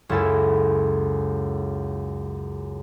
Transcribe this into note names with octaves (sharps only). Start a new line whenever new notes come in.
C#2 F#2 E4 A4 E5 G#5